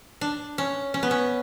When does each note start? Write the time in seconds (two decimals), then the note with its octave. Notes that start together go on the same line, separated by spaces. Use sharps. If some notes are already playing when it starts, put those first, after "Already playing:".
0.21 D4
0.58 C#4
0.94 C#4
1.03 B3
1.11 C#4